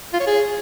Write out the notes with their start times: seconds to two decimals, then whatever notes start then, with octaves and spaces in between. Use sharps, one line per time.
0.13 F4
0.20 C#5
0.27 G#4